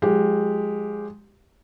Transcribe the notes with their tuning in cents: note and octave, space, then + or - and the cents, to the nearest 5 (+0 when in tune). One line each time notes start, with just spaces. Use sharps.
F3 +45 G#3 +0 G4 +0